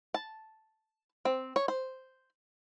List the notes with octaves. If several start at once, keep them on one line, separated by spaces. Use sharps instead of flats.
A5
C4
C#5
C5